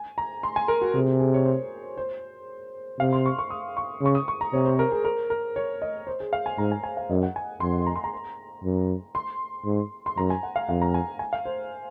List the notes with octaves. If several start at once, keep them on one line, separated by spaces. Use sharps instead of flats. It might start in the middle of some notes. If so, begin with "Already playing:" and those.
Already playing: G#5
A#5
C6
G#5
A#4
F#4
C3 G#4
G#4
C#5
C5
C5
C3 F5
C6
C#6
C#6
D#6
C#6
C#3 C#6
D#6
C#6
A#5
C3 C#5
C5
A#4
G#4
A#4
A#4
C#5
D#5
C5
G#4
F5
G#5
G#2 A#5
G#5
G#5
F5
F#2 D#5
F#5
G#5
F2 C6
A#5
C6
A#5
F#2
C6
G#2
C6
F#2 A#5
G#5
F#5
F5
F2 F5
A#5
G#5
G#5
F5
C5